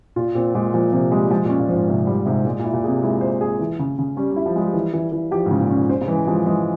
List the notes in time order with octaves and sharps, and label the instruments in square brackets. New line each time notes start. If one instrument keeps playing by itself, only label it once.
[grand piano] A#2 [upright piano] F4
[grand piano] A#2 [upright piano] C4
[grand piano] A#2 [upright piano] G#3
[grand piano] A#2 [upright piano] F3
[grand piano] C3 [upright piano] F3
[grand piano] G3 [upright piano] G#3
[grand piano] F3 [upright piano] G#3
[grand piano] A#2
[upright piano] C#4
[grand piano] A#2
[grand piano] G#2 [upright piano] F3
[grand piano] G#2 [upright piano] C3
[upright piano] G3
[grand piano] G#2 [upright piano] C3
[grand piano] A#2 [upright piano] G#3
[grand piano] A#2
[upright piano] E4
[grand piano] A#2
[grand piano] C3 [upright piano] G#4
[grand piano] G#3 [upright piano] E4
[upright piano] C5
G#4
E3
C#3
C#3
[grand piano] G3 [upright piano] C#4
[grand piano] G3
[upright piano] E4
[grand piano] F3
[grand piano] G3 [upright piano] G#3
[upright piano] E3
E3
E3
[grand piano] F3 [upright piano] G4
[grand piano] G#2
[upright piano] C#3
[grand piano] A#2
[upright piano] C#4
[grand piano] A#2
[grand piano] C#3 [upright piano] C5
[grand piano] C#3
[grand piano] E3 [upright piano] G#3
[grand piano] F3 [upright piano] G#3
[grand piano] E3 [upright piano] G#3